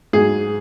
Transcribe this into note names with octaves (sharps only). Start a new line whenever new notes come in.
G#2 F#3 G#4